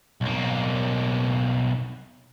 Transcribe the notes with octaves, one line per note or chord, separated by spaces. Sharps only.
B1 A#3